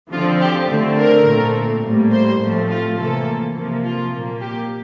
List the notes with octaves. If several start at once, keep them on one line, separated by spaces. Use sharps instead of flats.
D3 F3 C4 F4
G4
D3 A3 C4
A#4
A#2 A3 C4
A2 G3 A#3
C5
A2 F3 A3 C4
F4
C3 E3 A#3 A4
C3 F3 A#3
F4
A#2 F3 A#3
G4